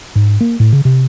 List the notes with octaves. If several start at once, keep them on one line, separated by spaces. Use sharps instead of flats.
G#2
A#3
A2
C#3
C3